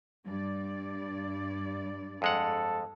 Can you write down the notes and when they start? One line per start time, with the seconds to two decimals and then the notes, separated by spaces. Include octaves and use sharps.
0.25 G2 D5
2.22 F2 G#3 A4 F#5